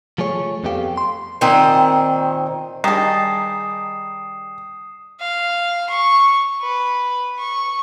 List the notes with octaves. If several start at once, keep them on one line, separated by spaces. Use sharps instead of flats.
F3 A3 G#4 C#5
F2 B3 D#4 G4 A4 F5
C6
A#2 D#3 C4 D#5
D#3 G3 D#4 G#4 A5 D#6 C7 E7
F5
C#6
B4
C#6